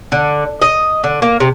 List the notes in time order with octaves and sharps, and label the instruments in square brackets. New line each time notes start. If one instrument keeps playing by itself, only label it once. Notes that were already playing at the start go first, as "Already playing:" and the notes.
[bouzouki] D3
D#5
D3
A#3
C3